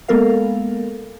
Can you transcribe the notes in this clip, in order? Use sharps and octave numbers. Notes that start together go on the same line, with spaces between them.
G#3 A#3 B3 A4 A#4 F5